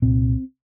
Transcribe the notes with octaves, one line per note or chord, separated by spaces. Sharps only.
C2 A#2 C4